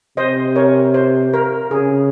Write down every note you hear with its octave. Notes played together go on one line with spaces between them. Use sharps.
C3 C5 D#5
A#4 C#5
C5
A#4
C#3 G#4